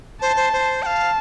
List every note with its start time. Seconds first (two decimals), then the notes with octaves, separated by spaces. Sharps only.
0.22 C5 A5
0.36 C5
0.53 C5
0.82 G5 A5
0.86 F5